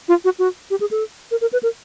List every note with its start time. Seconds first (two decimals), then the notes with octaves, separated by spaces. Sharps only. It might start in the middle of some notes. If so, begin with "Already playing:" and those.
0.08 F4
0.25 F#4
0.39 F#4
0.70 G4
0.80 G#4
0.91 A4
1.31 A#4
1.41 A#4
1.53 B4
1.63 A#4